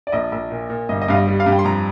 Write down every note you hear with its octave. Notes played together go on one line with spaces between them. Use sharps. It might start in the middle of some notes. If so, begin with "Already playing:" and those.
D5
A#1 D#5
A#1
A#2
A#2
G1 D#5
D#5
G2 F5
D#5
G3
F5
G2
G5
C6
F2 A#5